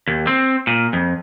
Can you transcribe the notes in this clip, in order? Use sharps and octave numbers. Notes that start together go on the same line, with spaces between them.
D#2
C4
A#2
F2